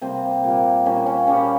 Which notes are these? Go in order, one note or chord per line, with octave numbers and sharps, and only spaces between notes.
C3 G3 A#3 C4
A#2 G3 A#3
A#2 G3 A#3 C#4
C#4
A#2 G3 A#3 C#4